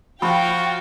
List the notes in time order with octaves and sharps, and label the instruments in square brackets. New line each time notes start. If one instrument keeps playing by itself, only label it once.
[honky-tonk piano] F3 F4 [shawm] F#4 [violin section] F5 G5 [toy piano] B5